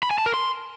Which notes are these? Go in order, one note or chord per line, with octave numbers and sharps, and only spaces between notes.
B5
G#5
A5
A#4
C6